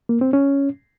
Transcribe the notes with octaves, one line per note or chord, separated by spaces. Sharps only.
A#3
C4
C#4